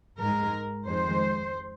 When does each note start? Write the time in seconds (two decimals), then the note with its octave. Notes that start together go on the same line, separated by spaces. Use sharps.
0.21 G#2 G#3 A#4
0.88 F2 D#3 G#3 C5